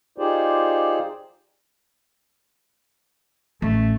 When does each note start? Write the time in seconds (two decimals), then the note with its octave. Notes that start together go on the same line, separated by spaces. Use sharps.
0.18 D#4 F4 G4 G#4 C5 D5
3.62 A1 A3